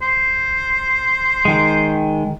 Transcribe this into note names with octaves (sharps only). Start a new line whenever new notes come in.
C5
D#3 G#3